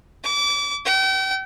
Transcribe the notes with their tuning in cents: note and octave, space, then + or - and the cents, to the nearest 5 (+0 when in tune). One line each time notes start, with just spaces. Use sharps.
D6 -30
G5 -40